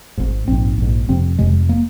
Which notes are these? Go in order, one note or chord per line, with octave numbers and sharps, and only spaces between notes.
G#1 G#2
A#1 G#2 C4
A#1 G#2
F1 F2 C3 C4
F1 F2 C3 G#3
A#3